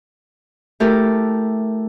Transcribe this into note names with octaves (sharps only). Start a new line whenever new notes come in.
A3 E4 G4 A4 A#4